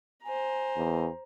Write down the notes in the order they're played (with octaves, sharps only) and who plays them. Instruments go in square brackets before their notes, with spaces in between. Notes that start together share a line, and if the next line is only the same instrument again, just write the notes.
[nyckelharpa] C5 A#5 [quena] G#5
[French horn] E2